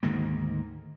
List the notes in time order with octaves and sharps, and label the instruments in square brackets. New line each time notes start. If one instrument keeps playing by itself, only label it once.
[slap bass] D2 G#2 D#3 A#3